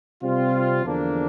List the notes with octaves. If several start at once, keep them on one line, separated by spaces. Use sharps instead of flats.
C3 G3 C4 F4
E2 D3 F3 A#3 D4